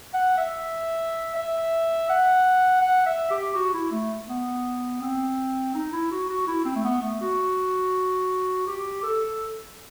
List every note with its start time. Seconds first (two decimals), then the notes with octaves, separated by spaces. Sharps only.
0.14 F#5
0.38 E5
1.35 E5
2.09 F#5
2.81 F#5
3.06 E5
3.30 G4
3.55 F#4
3.74 E4
3.91 A3
4.29 B3
5.02 C4
5.74 D#4
5.92 E4
6.11 F#4
6.29 F#4
6.47 E4
6.65 C4
6.76 A3
6.84 B3
7.02 A3
7.21 F#4
8.67 G4
9.03 A4